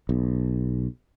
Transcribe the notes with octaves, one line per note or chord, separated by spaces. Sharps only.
B1